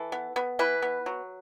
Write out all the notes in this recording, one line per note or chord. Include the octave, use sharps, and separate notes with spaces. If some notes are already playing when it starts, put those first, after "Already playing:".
Already playing: E3 A4
B3
B3
E3 B4
B3
F#3